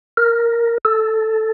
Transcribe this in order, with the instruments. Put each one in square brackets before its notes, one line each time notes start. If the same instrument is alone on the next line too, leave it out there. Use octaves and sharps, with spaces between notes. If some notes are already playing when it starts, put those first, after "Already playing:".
[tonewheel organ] A#4
A4